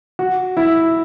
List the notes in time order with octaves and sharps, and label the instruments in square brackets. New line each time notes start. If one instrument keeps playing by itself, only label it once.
[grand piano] F#4
E4